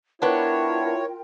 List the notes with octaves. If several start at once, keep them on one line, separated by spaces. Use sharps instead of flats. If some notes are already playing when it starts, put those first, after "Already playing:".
B3 D4 E4 F4 A#4 C#5 G5